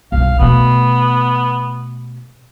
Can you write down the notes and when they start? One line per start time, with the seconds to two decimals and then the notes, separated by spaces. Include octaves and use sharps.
0.12 B1 G2 F5
0.39 B2 A3 B3